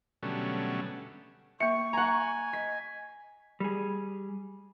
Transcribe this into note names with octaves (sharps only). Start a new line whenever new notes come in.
B2 D3 F#3 G3 A3 C#4
A#3 E5 C#6 C#7
F#5 G#5 A#5
D#5 B6
G3 G#4